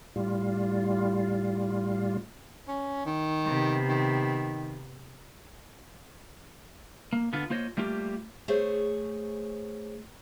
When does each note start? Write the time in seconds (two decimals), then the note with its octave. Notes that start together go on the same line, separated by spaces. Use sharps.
0.16 A2 G3 F4
2.68 C#4
3.06 D#3
3.46 C3 B3
3.88 D#3
7.13 A#3
7.33 D3 B3 F4
7.50 A#3 F4 C5 C#5 D#5
7.77 G3 A3 A#3 F4 G4
8.48 A3 G#4 C5 C#5